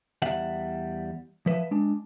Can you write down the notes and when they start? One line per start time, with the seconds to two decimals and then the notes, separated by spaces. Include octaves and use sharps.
0.22 E2 G3 E5 F#5
1.46 F3 B4 E5
1.71 G#3 D4